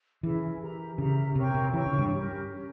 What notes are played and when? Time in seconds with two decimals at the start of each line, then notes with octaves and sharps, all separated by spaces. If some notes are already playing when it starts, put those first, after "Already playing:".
0.23 E3 C#4 E4 G#4 E5
0.61 G4 A#4 E5 A#5
0.98 C#3 G4 A#4 E5 A#5
1.35 C3 A#4 C#5 G5 C#6
1.55 C3
1.73 E3 A#4 C#5 G5 C#6
1.86 C#3
1.99 G2
2.11 C#4 G4 A#4
2.49 C#4 G4 A#4